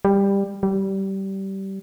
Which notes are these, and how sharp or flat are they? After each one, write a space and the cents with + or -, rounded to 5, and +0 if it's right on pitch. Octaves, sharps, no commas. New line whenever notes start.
G3 +15
G3 -20